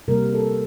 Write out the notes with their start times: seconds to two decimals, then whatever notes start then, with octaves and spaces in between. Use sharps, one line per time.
0.08 C3 G3 A#3 A#4
0.34 A4